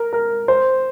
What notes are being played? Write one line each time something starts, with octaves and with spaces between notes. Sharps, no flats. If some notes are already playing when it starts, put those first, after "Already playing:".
Already playing: A#4
A#4
C5